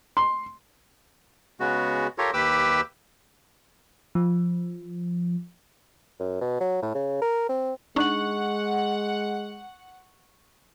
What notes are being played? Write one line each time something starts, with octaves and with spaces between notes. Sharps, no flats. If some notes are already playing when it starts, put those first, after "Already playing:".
C6
C#3 G#3 B3 F#4
F4 G4 A4 A#4 C#5
D#2 G4 B4 D6 E6
F3
F#2
B2
F#3
A2
C#3
A#4
C4
G#3 D4 D#4 F#5 C#6 F#6 F#7